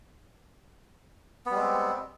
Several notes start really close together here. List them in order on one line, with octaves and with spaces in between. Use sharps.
B3 G3 G#3 C4